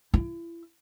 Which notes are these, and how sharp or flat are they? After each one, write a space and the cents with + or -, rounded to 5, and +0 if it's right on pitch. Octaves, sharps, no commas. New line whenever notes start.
E4 +35